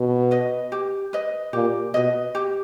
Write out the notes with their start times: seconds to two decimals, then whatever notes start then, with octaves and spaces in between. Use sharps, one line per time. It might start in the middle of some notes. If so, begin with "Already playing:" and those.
Already playing: B2
0.31 B4 D#5
0.72 G4
1.13 B4 D#5
1.53 A#2 G4
1.94 B2 B4 D#5
2.35 G4